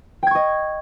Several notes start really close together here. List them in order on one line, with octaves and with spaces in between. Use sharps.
G5 G#6 C#6 D#5